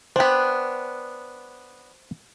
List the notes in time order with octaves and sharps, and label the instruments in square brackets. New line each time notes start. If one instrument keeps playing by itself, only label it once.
[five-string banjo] B3 D4 [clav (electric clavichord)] C5 G5